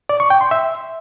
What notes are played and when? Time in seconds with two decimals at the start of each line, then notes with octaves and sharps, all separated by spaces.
0.09 D5
0.20 C#6
0.30 G5
0.41 C6
0.51 E5